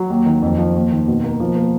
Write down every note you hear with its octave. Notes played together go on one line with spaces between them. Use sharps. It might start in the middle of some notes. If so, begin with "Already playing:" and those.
Already playing: F#3
D#2
D#3
F2
F3
D#2
D#3
B2
A#3
F3
A#3